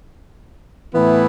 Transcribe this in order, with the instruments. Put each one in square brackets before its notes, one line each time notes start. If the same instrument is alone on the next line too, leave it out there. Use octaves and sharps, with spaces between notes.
[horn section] A2 E3 B3 E4